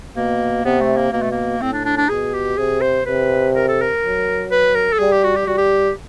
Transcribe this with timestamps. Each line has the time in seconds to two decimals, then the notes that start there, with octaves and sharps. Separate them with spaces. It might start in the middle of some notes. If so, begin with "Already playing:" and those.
0.17 B2 A#3
0.65 C3 B3
0.81 A3
0.97 A#3
1.12 B2 A#3
1.22 A3
1.32 A#3
1.62 A2 C4
1.73 D4
1.85 D4
1.97 D4
2.09 B2 G#4
2.34 G4
2.58 C3 G#4
2.82 C5
3.06 C3 B4
3.55 A#4
3.68 A4
3.82 A#4
4.03 F#3
4.51 B4
4.75 A#4
4.93 A4
4.99 G3 G#4
5.12 G4
5.24 F#4
5.36 G4
5.47 G3 F#4
5.58 G4